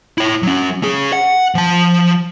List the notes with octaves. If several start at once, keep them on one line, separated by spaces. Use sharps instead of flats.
E4 C#5
F#3 C#4
C#4 G#4
F#5
F3 A5